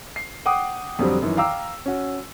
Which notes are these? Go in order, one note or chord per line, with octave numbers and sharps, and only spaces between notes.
C7
F#5 G5 D6 D#6
F2 D3 F#3 G3 C4
F#2 D#3 E3
F5 G5 A#5 D6 E6
C#4 F#4